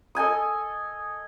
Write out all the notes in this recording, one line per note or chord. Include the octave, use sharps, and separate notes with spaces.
A4 D#5 G#5 D#6